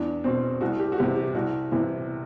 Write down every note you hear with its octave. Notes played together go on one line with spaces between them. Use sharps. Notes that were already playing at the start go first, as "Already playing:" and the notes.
Already playing: E2 D4
B2 C4
C2 F#4
G4
F#4
C3 E3 G4
G4
C2 F#4
C3 E3